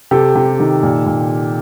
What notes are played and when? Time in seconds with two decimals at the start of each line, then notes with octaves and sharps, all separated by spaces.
0.11 C3 G4 A4
0.35 C3
0.60 D#3
0.83 A#2
1.06 A#2